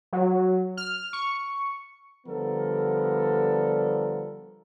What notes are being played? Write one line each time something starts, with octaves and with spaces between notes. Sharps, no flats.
F#3
F6
C#6
D3 F3 G3 B3 A4 A#4